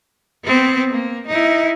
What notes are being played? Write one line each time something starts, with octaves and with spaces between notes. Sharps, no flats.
B3 C4
A#3
D#4 E4